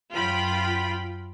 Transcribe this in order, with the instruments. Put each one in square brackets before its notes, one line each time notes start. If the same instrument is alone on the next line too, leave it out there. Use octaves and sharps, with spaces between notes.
[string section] F#2 F4 G5 B5